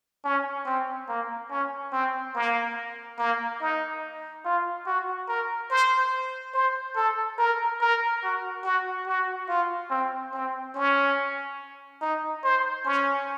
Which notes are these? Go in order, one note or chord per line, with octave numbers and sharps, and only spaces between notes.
C#4
C4
A#3
C#4
C4
A#3
A#3
D#4
F4
F#4
A#4
C5
C5
A4
A#4
A#4
F#4
F#4
F#4
F4
C4
C4
C#4
D#4
C5
C#4